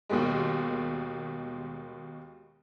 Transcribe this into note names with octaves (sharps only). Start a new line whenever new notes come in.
D#2 B2 D#3 G3 G#3